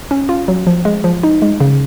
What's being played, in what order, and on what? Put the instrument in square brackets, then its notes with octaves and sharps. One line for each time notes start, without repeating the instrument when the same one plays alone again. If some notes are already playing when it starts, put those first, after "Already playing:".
[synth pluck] C#4
F4
F#3
F3
G#3
F3
D#4
G#3
C#3